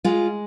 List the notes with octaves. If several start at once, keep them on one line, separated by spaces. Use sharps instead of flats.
G#3 F4